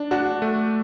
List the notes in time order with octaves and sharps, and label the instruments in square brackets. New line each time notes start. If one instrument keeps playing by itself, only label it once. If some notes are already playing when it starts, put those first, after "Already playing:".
Already playing: [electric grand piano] D4
[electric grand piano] D4 [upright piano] F#4
[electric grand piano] A3